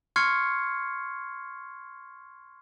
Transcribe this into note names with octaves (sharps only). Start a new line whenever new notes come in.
C6 C#6 F6 G#6 C7 C#7